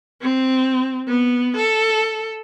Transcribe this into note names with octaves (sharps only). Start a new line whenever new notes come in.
C4
B3
A4